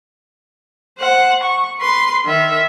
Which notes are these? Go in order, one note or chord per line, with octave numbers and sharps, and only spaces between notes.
C5 F#5
C#6
B4 C6
D#3 E5